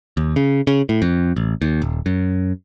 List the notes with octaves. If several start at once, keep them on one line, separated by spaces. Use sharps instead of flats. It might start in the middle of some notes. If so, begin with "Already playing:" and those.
D#2
C#3
C#3
A2
F2
A1
D#2
D#1
F#2